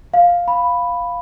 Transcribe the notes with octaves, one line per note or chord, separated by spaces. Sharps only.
F5
B5